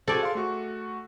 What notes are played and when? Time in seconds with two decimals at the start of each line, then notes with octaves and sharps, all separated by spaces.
0.08 F#4 A4 C5 D5 G#5
0.23 F5 C6
0.35 A3 F#4 C#6